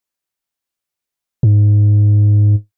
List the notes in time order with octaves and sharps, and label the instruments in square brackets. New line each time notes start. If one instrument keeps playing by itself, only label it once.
[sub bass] G#2